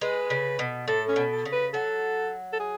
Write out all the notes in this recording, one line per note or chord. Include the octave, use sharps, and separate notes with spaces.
G#3 B4
C#3
B2
A2 A4
C#4
B2
A4
C#3
B4
F#3 A4
A4
G#4